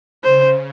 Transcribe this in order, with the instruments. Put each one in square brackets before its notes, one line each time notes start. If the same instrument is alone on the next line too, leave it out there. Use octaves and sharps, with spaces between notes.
[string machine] C#3 [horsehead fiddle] C5